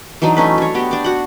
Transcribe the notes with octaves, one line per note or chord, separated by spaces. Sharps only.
E3 F#3 D4 D#4
A3 C#4 B4
D4 C#5
B3 F#4 G4
D4 D5
F#4 F#5